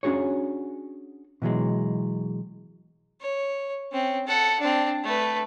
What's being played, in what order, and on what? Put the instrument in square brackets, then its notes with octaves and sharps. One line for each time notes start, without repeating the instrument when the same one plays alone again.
[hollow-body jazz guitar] C#4 D4 F#4 G#4 C#5
B2 E3 F#3 G#3
[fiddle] C#5
C4 C#4
A4 F#5
C4 D4
A3 B4